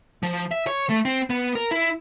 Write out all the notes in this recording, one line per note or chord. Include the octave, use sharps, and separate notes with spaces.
F3
E5
C#5
A3
C4
B3
A#4
E4